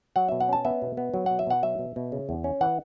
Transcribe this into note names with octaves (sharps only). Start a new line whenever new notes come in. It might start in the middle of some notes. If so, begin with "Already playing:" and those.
F#3 F#5
B2 E5
F#5
C#4 A5
B3 E5
B2
B3
F#3
B2 F#5
E5
B2 F#5
F#3 E5
B2
B2
C#3
E2
C#4
E3 F#5